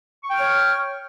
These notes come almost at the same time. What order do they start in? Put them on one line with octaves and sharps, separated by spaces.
C#6 G5 F6 C#5